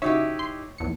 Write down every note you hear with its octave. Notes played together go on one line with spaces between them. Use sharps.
C#3 D#4 E4 F#4 G4 C#5 E5
C6
A#1 E2 C#7